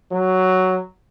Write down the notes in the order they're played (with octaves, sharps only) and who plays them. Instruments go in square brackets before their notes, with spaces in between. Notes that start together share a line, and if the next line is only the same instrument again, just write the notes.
[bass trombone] F#3